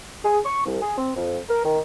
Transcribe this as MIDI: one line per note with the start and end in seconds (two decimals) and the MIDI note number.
0.24 0.38 68
0.46 0.65 85
0.66 0.77 36
0.82 0.94 68
0.98 1.12 60
1.16 1.40 41
1.49 1.64 70
1.64 1.79 51